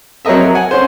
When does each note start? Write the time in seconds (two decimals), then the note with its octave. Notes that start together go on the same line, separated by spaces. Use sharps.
0.25 F#3 C4 A#4 D#5 E5
0.41 A#4
0.55 F#5 G#5
0.71 C#4 C5